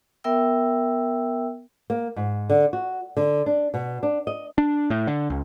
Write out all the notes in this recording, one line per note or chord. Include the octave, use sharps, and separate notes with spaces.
B3 A#4 E5 G5 E6
A#3
G#2
D3
F#4
D3
D4
B2
D4
D#5
D4
A2
D3
C#2